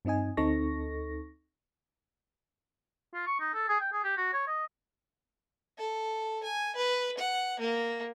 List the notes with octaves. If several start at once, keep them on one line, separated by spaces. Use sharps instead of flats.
G2 C4 D#4 D#5 G#5
D2 C4 D#4 A4 C#6 A#6
F4
C#6
D#4
A4
G#4
G5
G#4
G4
F#4
C#5
D#5
A4
G#5
B4
F#5
A#3